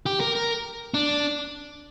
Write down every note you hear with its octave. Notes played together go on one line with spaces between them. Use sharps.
G4
A#4
A#4
D4